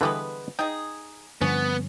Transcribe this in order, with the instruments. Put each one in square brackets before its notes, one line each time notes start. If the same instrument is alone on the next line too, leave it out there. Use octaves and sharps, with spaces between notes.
[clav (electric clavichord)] D3 E3 G3 [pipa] G#3 B3 B4
[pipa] D#4 G#4 [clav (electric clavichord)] G5
[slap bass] G2 D3 F3 [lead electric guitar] B3 [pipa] C#4